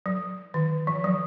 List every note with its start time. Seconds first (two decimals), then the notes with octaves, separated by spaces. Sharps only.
0.06 F#3
0.54 D#3
0.87 F3
1.04 F#3